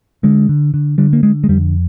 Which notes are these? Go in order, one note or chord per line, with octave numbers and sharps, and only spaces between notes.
D3 G#3
D3
D3
D3 G3
A#3
D3 G#3
G#3
F2 G3